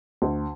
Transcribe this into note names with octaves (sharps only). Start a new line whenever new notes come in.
D2